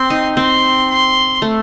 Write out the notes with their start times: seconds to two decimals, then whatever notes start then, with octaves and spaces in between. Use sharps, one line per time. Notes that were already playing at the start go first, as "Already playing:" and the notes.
Already playing: C4 C6
0.10 D#4
0.36 C4 C6
0.90 C6
1.42 A3